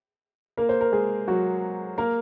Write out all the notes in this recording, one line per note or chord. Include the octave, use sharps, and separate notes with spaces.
A#3 A#4
C5
A#4
G#3 G#4
F#3 F#4
A#3 A#4